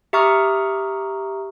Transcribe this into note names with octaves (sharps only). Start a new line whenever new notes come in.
G4 E5 A#5 C#6 D#6 F6